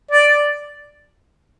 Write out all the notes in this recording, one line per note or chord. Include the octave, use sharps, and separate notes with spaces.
D5